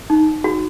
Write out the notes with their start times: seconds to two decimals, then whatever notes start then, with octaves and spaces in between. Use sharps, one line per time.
0.10 D#4
0.44 F#4